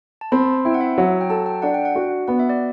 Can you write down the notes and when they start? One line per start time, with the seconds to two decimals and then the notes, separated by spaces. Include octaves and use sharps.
0.21 A5
0.32 C4 B5
0.65 E4 G5
0.74 F#5
0.81 E5
0.98 F#3
1.21 G5
1.30 A4 A5
1.46 G5
1.62 D4 F#5
1.74 G5
1.85 F#5
1.96 F#4
2.28 B3 F#5
2.39 E5
2.49 D5